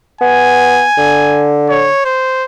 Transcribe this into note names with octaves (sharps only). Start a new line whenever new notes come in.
B3 G#5
D3
C#5
C5